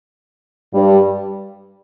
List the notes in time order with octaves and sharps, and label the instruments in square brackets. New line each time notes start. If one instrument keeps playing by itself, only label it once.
[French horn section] G2 G3